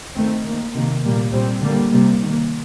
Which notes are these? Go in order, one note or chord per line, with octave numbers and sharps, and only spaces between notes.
D#3 A3 C4
D#3 A#3
C3 D#3 A#3
A#2 G3 A#3
A#2 G3 C4
D3 G3 A#3
C3 G3 A#3
D#3 A#3